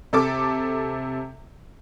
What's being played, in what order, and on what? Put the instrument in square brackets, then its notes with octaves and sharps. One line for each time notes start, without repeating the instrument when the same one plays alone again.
[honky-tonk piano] C3 A4 D6